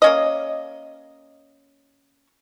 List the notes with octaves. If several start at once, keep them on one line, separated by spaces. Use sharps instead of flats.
A#3 C#4 D#5